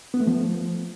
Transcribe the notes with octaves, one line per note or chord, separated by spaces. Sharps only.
B3
A3
F3